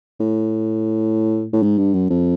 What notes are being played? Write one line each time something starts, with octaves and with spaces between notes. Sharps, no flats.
A2
A2
G#2
G2
F#2
F2